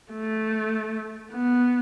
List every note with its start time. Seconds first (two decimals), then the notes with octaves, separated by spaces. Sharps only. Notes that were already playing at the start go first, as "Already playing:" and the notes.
0.12 A3
1.32 B3